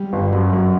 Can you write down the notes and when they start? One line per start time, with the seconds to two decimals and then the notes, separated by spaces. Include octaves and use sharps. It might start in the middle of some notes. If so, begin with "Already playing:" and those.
Already playing: G3
0.13 G1
0.32 F#2 F#3
0.53 F#2